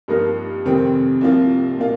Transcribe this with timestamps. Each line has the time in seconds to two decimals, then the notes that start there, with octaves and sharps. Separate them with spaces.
0.08 G2 F3 A#3 D#4 A#4
0.65 F1 F2 D#3 C4 G4
1.21 C2 C3 F3 A#3 F4
1.78 A#2 A#3 F4